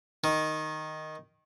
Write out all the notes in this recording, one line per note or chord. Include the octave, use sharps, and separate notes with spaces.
D#3